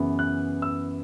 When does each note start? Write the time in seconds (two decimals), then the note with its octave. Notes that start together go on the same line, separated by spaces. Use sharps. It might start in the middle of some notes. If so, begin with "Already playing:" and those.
Already playing: F#2 C#3 E3 B3
0.19 F#6
0.62 E6